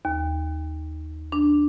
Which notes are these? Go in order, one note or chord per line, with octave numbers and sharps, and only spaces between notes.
D#2
D4